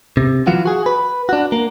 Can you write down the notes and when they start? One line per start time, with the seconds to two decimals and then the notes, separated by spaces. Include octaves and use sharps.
0.17 C3
0.47 E3 F#3 F4 F#4
0.65 F#4 G#4
0.86 B4
1.29 D4 F#4
1.52 A#3